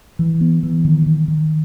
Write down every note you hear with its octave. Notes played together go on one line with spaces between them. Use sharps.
E3
B3
E3
D#3
D#3
D#3